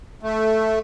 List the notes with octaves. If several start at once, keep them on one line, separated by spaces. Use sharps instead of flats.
A3